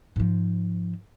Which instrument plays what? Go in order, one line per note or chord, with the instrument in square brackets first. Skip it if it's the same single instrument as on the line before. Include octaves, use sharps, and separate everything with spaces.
[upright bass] G#2 F3